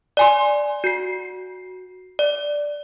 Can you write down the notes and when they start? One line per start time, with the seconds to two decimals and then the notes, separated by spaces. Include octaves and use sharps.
0.17 D5 G#5 C6
0.84 F#4 C7
2.19 D5